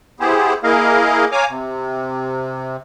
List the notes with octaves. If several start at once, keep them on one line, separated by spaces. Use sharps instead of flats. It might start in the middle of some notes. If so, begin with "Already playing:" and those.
B3 E4 G4 G#4 C5
A#3 E4 G#4 A#4 D#5 F5
C#5 F5 G#5 A#5 D6
C3